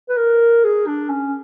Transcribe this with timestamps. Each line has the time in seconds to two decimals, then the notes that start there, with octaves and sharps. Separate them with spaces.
0.09 B4
0.17 A#4
0.64 G#4
0.87 D4
1.10 C#4